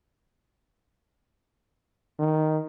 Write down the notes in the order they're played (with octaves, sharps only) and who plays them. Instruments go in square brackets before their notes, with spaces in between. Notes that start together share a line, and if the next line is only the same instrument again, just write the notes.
[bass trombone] D#3